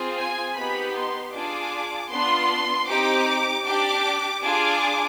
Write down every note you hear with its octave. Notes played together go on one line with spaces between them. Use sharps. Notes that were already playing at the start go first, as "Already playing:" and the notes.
Already playing: C4 F4 G#4
G#5
B3 D#4 G4 B5
C6
D4 F4 G#4 D6
B3 D4 F4 C6
C4 D#4 G4 D6
D4 G4 D6
D4 F4 G#4 D6